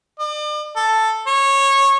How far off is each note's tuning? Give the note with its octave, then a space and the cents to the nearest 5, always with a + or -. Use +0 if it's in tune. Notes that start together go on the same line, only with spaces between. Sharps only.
D5 +40
A4 +5
C#5 -15